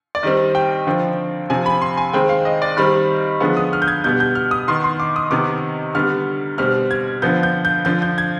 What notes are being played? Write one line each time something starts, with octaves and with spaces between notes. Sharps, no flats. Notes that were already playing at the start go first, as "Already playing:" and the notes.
D5
D#3 G3 C4 D#5
G5
D3 F3 C4
C3 F3 C4 G#5
B5
C6
G#5
D#3 G#3 C4 G5
F5
D#5
D5
D#3 G3 C4 B5
D3 F3 G#3 B3
D#6
F6
G6
G#6
B2 G3 B3 G6
G6
F6
D#6
D#3 B3 C6
C6
D6
D#6
C3 D#3 B3 D6
D3 G3 B3 F6
B2 G3 C4 F6
G#6
D3 F3 B3 G6
G6
G6
D3 F3 C4 G6
G6
G#6